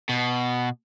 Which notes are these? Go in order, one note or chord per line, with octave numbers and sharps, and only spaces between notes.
B2